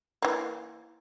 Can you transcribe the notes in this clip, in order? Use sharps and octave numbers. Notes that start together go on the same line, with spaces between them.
E3 A#3